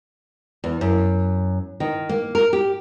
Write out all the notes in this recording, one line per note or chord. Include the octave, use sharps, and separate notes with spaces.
E2
F#2
D#3
A#3
A#4
G4